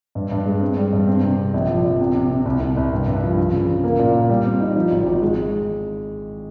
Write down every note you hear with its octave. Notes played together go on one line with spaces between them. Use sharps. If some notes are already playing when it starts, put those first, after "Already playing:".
G2
G2
G#3
C4
G3
G2
C4
C3
C3
A#1
F3
A#1
C3
C3
C3
C2
C2
C2
G2
G2
F3
F3
C#3
C#3
A#3
A#2
A#3
G3
C4
D#4
F3
G#1
G#1
G#3